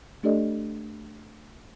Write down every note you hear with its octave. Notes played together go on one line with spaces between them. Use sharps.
A3 D4 G4 A4 D5 D#5